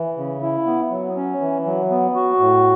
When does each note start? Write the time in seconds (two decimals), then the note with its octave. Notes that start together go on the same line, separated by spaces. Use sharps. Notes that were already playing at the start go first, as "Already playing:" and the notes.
Already playing: E3
0.17 C#3
0.42 E4
0.66 B3
0.91 F#3
1.16 C#4
1.41 E3
1.65 F#3
1.90 B3
2.15 F#4
2.40 A2